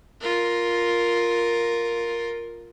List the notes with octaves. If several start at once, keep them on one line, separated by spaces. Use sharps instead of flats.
F4 A#4